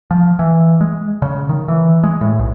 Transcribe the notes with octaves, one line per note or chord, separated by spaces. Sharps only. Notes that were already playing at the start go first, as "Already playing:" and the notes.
F3
E3
G#3
C#3
D#3
E3
G#3
A2
B1